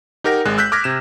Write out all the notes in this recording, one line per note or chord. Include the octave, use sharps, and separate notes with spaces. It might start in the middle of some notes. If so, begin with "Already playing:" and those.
D#4 G4 A#4 F#5 A#6
G#1 G#3 F#6
E6 F#6 G6 B6
D6 F6 G#6 A#6
C3 E7